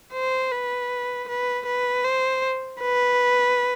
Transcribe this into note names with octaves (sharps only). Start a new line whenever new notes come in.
C5
B4
B4
B4
C5
B4